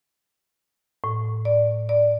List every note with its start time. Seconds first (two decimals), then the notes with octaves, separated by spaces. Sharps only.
1.04 A2
1.45 D5
1.89 D5